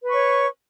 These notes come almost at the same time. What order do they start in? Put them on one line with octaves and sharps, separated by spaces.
B4 C#6 C#5